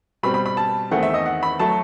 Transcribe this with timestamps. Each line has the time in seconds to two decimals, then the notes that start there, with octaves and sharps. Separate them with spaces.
0.23 B2 G3 C4 B5
0.34 B5
0.46 B5
0.57 A5
0.91 E2 D#3 A3 C4 F#5
1.03 E5
1.14 D#5
1.26 F#5
1.43 B5
1.59 F#3 A3 A5